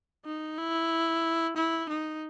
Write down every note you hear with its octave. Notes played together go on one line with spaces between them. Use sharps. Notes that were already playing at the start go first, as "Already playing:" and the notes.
D#4
E4
E4
D#4